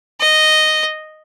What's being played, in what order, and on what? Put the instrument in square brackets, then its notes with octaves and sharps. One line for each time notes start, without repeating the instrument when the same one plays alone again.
[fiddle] D#5